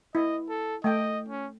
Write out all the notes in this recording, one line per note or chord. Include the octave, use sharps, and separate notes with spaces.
E4 D#5
A4
A3 D#5 G5
C#4